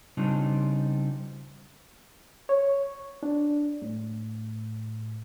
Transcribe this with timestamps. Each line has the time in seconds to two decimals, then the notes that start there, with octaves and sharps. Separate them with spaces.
0.17 C#3 G3 C4 D4 D#4 F4
2.49 C#5
3.23 D4
3.82 A2